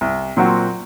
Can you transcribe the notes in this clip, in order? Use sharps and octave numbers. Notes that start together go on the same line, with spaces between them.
C2
A#2 F#3 C4 F#4